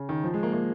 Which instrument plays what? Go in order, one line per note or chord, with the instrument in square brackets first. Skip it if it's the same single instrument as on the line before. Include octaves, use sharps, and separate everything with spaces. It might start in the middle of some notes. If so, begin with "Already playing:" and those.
Already playing: [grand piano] C#3
D#3
F3
G#3
A#3
A#3